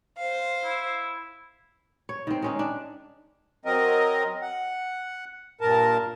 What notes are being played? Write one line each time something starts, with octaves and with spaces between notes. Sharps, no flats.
C5 F5
E4
C#5
D#3 C4
G#3 C#4 D#4
D4
F#3 C4 A#4 D#5
F#5
G2 A#2 A#4 A5